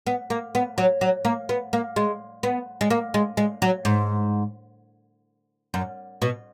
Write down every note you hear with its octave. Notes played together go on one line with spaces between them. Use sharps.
B3
A#3
B3
F#3
F#3
A#3
B3
A#3
G#3
B3
G#3
A#3
G#3
G#3
F#3
G#2
F#2
B2